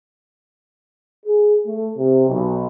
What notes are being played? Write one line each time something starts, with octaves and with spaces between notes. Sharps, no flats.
G#4
A3
C3
B1